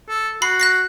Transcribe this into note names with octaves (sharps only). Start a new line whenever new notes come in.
A4
F#4 B5 C7
F#6 A#6 C7